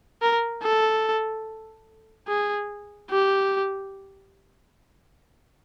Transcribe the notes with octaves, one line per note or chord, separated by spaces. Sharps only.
A#4
A4
G#4
G4